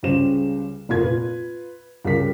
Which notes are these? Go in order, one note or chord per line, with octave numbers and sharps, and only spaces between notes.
C#2 C#3 G3 C#4 C5 E7
F1 A#2 F4 A#4 G#6
F4 B4
C#2 G3 A#4 B6